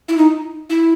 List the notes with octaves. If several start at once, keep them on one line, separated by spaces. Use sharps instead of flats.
E4
D#4
E4